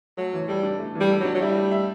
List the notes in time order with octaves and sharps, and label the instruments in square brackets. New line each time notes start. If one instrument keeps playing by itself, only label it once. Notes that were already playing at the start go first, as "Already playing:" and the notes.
[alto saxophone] F#3 [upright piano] A3
[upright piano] E3
[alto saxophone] G3 [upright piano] A4
[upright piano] D4
A3
[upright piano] E3 [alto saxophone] G3
[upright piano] A4
[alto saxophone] F#3 [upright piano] D4
[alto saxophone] F#3
[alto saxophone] G3 [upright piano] E4
[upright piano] A3
E5